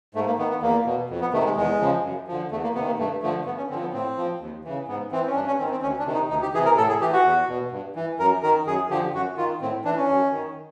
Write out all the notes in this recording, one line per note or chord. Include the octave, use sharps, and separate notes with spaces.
G#2 A3
A#3
D#3 B3
B3
E2 A#3
B2
F2
B3
C3 D#3 A3
G#3
E2 G#3
C#3 F3
F#2
D3 F3
E2 A3
A#3
C3 B3
D#3
A#3
G2 A3
D3 F3 A3
G2 B3
C#4
D3 F3 C4
B3
A2 C4
F3
D#2
C#3 E3
G#2 B3
E3 C4
C#4
G2 D4
C#4
D#3 C4
C4
D2 C#4
D4
C3 D#3
D#4
D2 D#4
G4
C3 E3 G#4
A#4
A2 A4
G#4
E3 G4
F#4
E2
B2
G2
E3
F#2 A#4
D#3 A#4
F#2 G#4
D3 F3 G4
F#2 F#4
D#3 F4
A2 C4
E3 D4
C#4
F#2
D#3